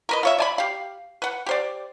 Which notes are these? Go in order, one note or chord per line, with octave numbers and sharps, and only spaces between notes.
A#4 B4 D#5
F4 C#5 E5
D5 G#5 B5
G4 F5
B4 F#5
G4 C5 D5